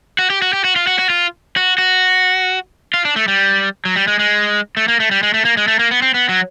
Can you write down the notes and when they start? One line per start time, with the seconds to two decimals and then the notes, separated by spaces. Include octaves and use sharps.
0.19 F#4
0.30 G4
0.42 F#4
0.53 G4
0.64 F#4
0.76 F4
0.87 F#4
0.99 F#4
1.10 F4
1.57 F#4
1.78 F#4
2.94 F4
3.05 D4
3.16 A3
3.28 G3
3.85 F#3
3.96 G3
4.08 G#3
4.19 G#3
4.77 A3
4.88 A#3
5.00 A3
5.11 G3
5.23 G#3
5.34 A3
5.45 A#3
5.57 G#3
5.68 A3
5.79 A#3
5.91 B3
6.02 C4
6.14 B3
6.29 F#3